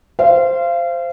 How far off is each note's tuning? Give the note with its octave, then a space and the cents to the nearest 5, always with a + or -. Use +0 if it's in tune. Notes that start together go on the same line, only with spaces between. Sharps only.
C5 +0 F5 -30